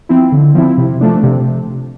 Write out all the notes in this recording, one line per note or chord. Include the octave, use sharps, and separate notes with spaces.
F3 C4 E4
D3
F3 C4 E4
C3
F3 A3 D4
C3